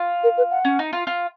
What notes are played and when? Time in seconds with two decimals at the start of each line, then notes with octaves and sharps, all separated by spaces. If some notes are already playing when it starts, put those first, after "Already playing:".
Already playing: F4
0.24 A#4
0.38 B4
0.51 F#5
0.65 C#4
0.79 D#4
0.93 F4
1.07 F4